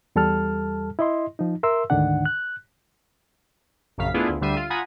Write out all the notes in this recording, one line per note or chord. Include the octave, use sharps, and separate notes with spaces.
E2 G3 A4 A5 F6
E4 D#5 C6
F3 D#4
A#4 E5 C6 E6
D2 G#2 D3 D#3 D4 F#5
F#6
A#1 F#2 C#3 F5 B6
A3 B3 D4 E4 F4 G#4
D2
D2 D3 G3 E5 C7 D#7
F4
F4 F#5 G#5 A#5 B5 D#6